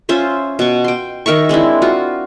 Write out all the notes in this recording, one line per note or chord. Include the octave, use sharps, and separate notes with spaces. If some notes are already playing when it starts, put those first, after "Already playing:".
C#4 F4 C5 E5
B2 C#6
G5 C6
D#3 A#4 E5 C#6
G#3 C4 D4 E4
F4 F#4